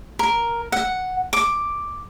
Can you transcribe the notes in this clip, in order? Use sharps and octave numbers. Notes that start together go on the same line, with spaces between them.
A#4
F#5
D6